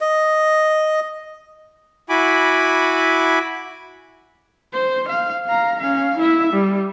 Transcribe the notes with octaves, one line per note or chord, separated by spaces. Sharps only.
D#5
E4 F#4 G#5 B5 D6
C5
F5
F5 A#5
C#4 F5
E4 E5
G3